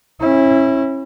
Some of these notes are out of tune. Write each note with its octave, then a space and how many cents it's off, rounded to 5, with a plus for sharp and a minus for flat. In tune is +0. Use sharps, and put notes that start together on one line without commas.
C#4 -35 E4 -5